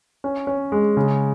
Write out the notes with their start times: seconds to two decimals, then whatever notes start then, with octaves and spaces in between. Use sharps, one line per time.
0.24 C#4
0.47 C#4
0.72 G#3
0.97 C#3